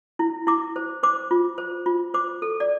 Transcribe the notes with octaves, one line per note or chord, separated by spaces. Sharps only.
E4
E4 D6
C5
C5 D6
F4
C5
F4
C5 D6
A4
D5